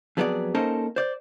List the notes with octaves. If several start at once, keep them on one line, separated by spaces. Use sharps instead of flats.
F2 F#3 B3 E4 G#4 D5
A#3 C#4 D#4 A4 A#4 C5
C5 D5